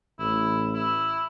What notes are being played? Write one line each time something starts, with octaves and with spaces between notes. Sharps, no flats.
A1 E4
E4